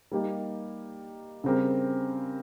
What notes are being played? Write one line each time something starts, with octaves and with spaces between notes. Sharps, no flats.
G3 A#3 D#4 G4
C#3 G3 C4 G4 A#4